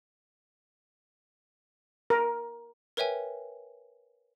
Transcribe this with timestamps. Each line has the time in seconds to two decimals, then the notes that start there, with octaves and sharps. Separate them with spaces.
2.10 A#4
2.97 A#4 B4 C#5 E5 G5 G#5